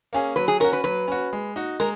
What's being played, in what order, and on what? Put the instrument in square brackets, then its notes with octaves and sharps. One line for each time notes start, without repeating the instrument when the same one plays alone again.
[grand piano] A#3 C#4 G#4
[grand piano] F#3 [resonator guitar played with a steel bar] B4
[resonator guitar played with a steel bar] G#4
[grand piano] C#4 [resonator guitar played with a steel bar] A#4
[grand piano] F#4
[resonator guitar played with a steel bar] B4
[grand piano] F#3 [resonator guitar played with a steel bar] B4
[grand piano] C#4 F#4
G#3
D#4 F#4
[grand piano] G#3 [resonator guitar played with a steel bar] A#4